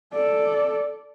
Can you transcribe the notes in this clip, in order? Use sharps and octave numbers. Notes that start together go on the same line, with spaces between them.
A4 D5